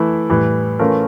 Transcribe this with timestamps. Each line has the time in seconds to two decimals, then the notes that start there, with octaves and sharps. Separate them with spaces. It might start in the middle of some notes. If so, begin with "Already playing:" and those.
Already playing: E3 A3 E4
0.29 A2 E3 G3
0.79 E3 A3 C#4 F4 A#4